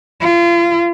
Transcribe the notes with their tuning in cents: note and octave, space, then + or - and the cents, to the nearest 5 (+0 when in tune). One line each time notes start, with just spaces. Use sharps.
F4 -35